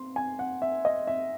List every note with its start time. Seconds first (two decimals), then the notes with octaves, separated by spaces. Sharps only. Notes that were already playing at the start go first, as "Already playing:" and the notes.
Already playing: C4 C6
0.16 G#5
0.39 F#5
0.62 E5
0.85 D#5
1.07 E5